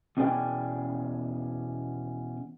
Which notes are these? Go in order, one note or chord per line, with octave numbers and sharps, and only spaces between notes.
E2 B2 C#4 G#4 D5 G5